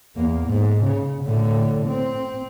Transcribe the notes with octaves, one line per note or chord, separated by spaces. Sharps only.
E2 A#3
G#2
C#3
A2 D3
C4